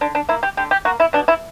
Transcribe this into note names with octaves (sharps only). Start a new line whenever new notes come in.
D3 D4
D4
A#3 E4
G4
D3 G4
G4
A#3 F#4
E4
B2 D4
E4